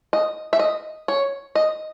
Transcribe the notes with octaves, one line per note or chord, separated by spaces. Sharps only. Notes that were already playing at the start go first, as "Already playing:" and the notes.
D#5
E5
D#5
C#5
D#5